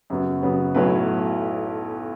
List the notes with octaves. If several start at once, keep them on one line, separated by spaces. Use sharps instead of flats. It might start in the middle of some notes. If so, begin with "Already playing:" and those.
F#2 C#3 F#3 B3
F#2 C#3 F#3 B3
B1 A2 F#3 B4